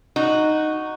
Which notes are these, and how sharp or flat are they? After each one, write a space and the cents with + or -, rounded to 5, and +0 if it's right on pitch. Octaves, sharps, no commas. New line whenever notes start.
D#4 -5 F#4 +0